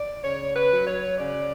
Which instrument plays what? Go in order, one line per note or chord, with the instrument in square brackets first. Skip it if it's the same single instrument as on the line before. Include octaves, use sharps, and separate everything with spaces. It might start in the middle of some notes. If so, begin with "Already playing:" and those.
Already playing: [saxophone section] D5
C#3 C#5
B4
F#3
C#5
C#3 D5